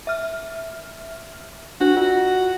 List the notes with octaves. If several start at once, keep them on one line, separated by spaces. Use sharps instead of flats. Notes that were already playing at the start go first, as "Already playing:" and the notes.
E5 F6
D4 F#4
F4 F#4